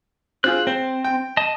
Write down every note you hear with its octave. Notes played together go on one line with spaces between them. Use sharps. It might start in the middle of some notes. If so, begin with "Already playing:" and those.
C4 F4 G#4 F#6
C4 C5
G5
D#5 A5